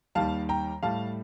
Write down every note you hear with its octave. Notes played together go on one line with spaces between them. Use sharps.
D#2 D#3 G3 F5 A5
G5 A#5
A2 G3 F5 A5